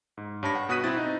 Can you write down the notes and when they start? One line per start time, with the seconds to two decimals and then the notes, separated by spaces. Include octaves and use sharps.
0.17 G#2
0.43 G2 C#5 A5 B5 A#6
0.55 F#5
0.69 B2 F#4 D#6 F#6 B6 D#7
0.84 C4 E4 A6
0.97 D#4